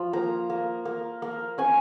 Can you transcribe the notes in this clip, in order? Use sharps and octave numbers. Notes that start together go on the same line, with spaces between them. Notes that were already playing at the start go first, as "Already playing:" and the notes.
Already playing: F3
A#3 A#5
A#3
A#3
A#3
C#4 G#5